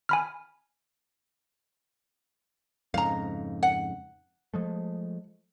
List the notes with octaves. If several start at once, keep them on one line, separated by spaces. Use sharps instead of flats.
G#5 B5 F6
F2 G#2 C#3 F5 A#5
F#5
F3 G#3 A3